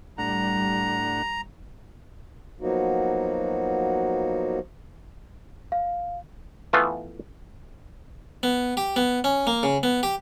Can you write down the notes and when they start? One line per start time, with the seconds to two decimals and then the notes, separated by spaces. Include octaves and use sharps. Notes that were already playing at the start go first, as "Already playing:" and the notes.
0.18 A2 G3 D4 F#5 A#5
2.61 F3 F#3 A#3 B3 D#4 F#4
5.72 F5
6.73 E3 A3 B3 F4
8.43 B3
8.77 G4
8.96 B3
9.24 C#4
9.47 A#3
9.63 C#3
9.83 B3
10.03 G4